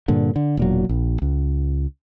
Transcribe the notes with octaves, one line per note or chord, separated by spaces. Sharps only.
G2 A#2 D3
D3
E1 A#2 F#3
A#1
C#2